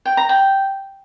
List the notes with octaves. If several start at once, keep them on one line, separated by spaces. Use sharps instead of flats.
G5
A#5
G5